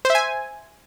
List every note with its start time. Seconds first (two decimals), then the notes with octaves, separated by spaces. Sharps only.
0.05 C5
0.10 E5
0.15 G#5